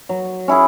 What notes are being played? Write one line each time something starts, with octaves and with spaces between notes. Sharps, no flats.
F#3
C#4 E4 G#4